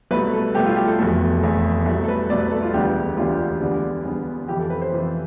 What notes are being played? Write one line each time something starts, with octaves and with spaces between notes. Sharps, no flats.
C2 B2 A3 B4
A4
C2 B2 A3 G4
F4
G4
A4
F1 E2 B2 A3
F1 E2 B2 A3
C2 B2 A3
A4
B4
C2 B2 A3 D5
B4
A4
F4
E1 D2 D3 G3 B3 G4
E1 D2 D3 G3 B3 F4
E2 D3 G3 B3
E2 D3 G3 B3
F2 C3 E3 G4
A4
B4
C5
F2 C3 E3